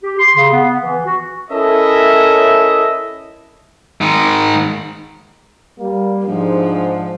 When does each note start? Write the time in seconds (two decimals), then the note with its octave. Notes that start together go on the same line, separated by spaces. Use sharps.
0.03 G4
0.19 C6
0.37 C#3
0.53 B3
0.82 E3
1.06 F#4
1.51 C#4 E4 A4 A#4 D#5 E5
4.01 D#3 G#3
5.79 G3 A#3
6.26 G#2 F3 D4